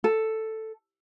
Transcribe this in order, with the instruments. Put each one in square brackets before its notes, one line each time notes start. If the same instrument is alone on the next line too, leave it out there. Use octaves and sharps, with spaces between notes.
[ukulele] A4